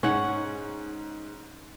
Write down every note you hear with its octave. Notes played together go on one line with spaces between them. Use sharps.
G#2 C#4 F#5